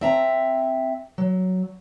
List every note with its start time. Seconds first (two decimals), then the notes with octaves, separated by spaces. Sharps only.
0.01 C4 E5 A#5
1.18 F#3